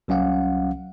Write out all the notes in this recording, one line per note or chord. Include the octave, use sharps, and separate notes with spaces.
C2 F#3 C#4 F5 F#5